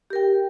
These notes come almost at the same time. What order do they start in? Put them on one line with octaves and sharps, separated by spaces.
G4 A#4 G5